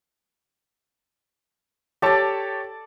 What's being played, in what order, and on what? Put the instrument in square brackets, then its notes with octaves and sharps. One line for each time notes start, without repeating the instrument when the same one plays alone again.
[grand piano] G4 C#5 A5 [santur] A4 D5